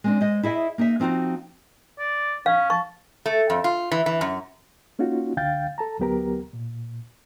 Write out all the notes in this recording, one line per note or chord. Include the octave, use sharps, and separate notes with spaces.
G#3 C4 D4
G#3 C5 D#5
E4 G#4 D#5 E5
A#3 D#4 G#4 E5
F3 C4 D#4 F4 F#4
D5
C#4 F5
A5 C#6
A3
F2
F4
E3
E3
F#2
A#3 C#4 D#4 F4 F#4
C#2 D3 F5 G5 G6 A6
A4 A5 A#5
D2 F#3 B3 G4 A#4 A#5
A#2